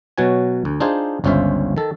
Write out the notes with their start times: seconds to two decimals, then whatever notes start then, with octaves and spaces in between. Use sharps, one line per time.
0.18 B2 F#3 F#4 C#5 G#5
0.65 D2
0.80 D4 D#4 F4 G#4 C5
1.24 G1 C#2 C#4 F4 C5 E5
1.77 D#3 A4